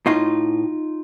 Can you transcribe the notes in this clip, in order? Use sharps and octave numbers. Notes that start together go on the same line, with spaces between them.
A2 D#4 F4